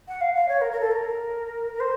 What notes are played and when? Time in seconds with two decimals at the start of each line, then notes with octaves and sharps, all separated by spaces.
0.08 F#5
0.21 F5
0.34 F5
0.48 C#5
0.61 A#4
0.71 A#4
0.80 A4
0.91 A#4
1.73 A#4
1.80 C5